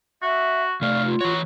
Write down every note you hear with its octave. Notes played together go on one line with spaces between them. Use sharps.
F#4 E5
C3 A3 D5 F5
F4
E3 F#4 C#5